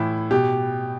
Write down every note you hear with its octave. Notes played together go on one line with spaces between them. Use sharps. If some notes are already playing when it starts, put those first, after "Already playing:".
Already playing: A2 E3 E4
B2 G4